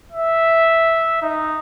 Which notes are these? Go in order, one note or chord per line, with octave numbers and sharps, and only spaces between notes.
E5
D#4